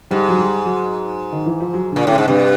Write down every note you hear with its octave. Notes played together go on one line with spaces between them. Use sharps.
G#2 G3
F#3
G3
F#3
D#3
E3
F3
F#3
A#2 D3
A2 C#3
G#2
G2 C3